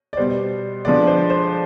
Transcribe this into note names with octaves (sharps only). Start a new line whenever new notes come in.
D5
B2 G3 B3 C5
D3 F3 G#3 B3 D5
C5
C5